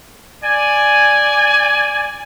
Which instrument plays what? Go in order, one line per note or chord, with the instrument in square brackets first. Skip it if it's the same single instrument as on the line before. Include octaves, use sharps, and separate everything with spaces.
[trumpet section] D5 G#5